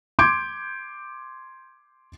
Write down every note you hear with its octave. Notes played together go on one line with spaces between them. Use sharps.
C6 D6 G6 G#6 D7